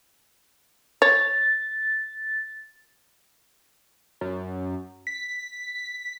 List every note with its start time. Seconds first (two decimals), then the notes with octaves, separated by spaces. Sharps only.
1.02 C#5 A6
4.21 F#2
5.07 B6